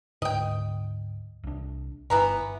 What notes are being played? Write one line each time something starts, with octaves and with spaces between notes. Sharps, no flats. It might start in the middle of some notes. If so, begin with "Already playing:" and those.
D2 G#2 D3 D#5 G5
C2 D4
G1 E3 B3 A#5